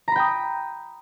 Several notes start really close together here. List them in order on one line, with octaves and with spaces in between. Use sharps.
A#5 B5 G5 D#6